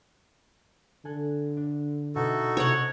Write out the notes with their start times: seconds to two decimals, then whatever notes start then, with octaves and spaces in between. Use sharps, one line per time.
1.05 D3 A4 G#5 F#6
1.57 D4
2.15 B2 D#4 E4 F#4 A4
2.57 C3 C4 C#4 C#5 F#5